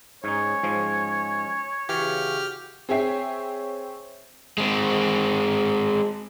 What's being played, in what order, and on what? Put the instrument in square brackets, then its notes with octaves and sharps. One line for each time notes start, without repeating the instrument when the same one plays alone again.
[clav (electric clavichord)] G#2 D#4 [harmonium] C#4 [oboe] C#5
[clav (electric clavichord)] G#2 F3 G#3
[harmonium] C#3 F#4 [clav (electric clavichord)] E3 [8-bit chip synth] G4 F6
[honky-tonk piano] C4 G#4 C#5 E5 G5 C7
[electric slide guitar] G#3 C4